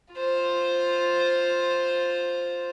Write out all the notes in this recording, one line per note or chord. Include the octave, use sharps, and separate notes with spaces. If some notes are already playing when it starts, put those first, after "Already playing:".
F4 C5